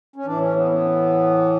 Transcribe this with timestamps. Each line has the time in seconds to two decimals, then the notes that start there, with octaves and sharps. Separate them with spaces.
0.16 C#4
0.26 A2 E3 D4
0.41 C#4
0.55 B3
0.66 C#4
0.71 B3